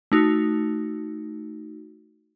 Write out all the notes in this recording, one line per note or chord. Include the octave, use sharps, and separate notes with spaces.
A3 D#4 F#4